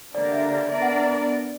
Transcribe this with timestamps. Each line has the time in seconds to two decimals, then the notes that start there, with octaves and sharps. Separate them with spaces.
0.14 D3 A#3 D4 G4 A#4 D5
0.32 E5
0.51 D5
0.68 B3 D4 A#4 D5 E5
0.82 F#5